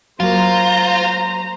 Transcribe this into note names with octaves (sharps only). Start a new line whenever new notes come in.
F#3 A#3 F4 C5 A#5